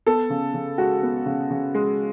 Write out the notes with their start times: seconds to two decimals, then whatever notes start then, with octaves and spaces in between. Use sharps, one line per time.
0.06 B3 A4
0.30 C#3
0.54 C#3
0.78 G#3 F#4
1.03 B3
1.26 C#3
1.51 C#3
1.74 G#3